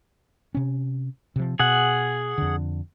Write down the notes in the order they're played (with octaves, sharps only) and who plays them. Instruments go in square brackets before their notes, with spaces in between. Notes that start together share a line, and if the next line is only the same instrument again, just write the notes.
[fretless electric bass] C3 C#4
C3 F3
[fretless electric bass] B2 [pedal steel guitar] G#4 F#5
[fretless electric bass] F2 D3